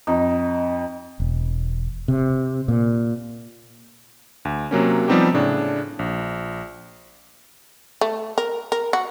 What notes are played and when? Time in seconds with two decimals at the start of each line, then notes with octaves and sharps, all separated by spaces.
0.07 F2 D#4
1.20 E1
2.08 C3
2.68 A#2
4.45 D2
4.71 C3 F#3 A#3 C#4
5.08 F3 G3 B3 C4 D#4 G4
5.34 A2 C#3 D4
5.99 A#1
8.01 A3
8.38 A#4
8.72 A#4
8.93 F#4